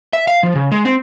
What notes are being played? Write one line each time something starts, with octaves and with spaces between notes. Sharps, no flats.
E5
F5
F3
C#3
G#3
C4